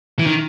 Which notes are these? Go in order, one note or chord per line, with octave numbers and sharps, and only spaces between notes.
E3
D#3